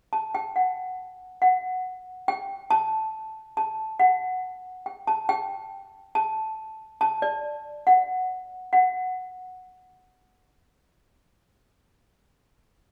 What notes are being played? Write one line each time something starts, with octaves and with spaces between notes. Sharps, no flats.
A5
G5
F#5
F#5
G5
A5
A5
F#5
G5
A5
G5
A5
A5
D5
F#5
F#5